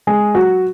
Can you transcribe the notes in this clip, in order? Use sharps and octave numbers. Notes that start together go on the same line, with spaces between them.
G#3 G#4
F#3 F#4